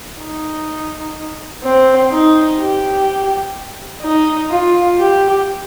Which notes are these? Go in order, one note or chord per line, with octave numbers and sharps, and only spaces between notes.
D#4
C4
D#4
G4
D#4
F4
G4